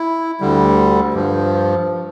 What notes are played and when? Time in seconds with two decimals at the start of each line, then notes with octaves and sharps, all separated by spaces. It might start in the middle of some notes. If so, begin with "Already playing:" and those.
Already playing: E4
0.40 D2 D3 G3
1.14 G2 F3